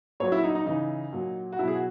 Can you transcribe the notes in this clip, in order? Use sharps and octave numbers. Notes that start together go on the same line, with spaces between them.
A#2 F#3 C#5
E4
D#4
D#4
C#3 E3 D#4
A#2 F#3
F#4
B2 F#3 E4
G#4
F#4